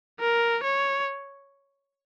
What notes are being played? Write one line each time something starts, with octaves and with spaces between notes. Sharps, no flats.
A#4
C#5